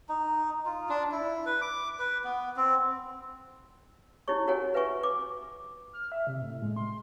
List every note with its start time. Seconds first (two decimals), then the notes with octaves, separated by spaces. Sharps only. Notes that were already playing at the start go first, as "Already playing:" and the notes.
0.09 D#4
0.66 F4
0.89 D4
1.12 E4
1.46 B4
1.62 D6
1.99 B4
2.24 B3
2.56 C4
4.28 D#4 E4 G4 C#5 C#6
4.47 F#4 G4 A#4 C#5 F#5 G#5
4.74 B4 E5 F#5 G#5 C#6
5.01 B4 D6
5.93 F6
6.12 E5
6.27 C3
6.41 A2
6.62 G#3
6.76 C6